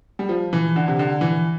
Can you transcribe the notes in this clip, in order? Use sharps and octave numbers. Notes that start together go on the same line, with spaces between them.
G3
F3
E3
D3
C3
D3
E3